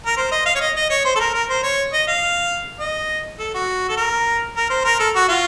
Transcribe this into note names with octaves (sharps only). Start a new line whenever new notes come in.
A#4
C5
D#5
F5
C#5
D#5
D#5
C#5
C5
A4
A#4
A#4
C5
C#5
D#5
F5
D#5
A4
F#4
A4
A#4
A#4
C5
A#4
A4
F#4
F4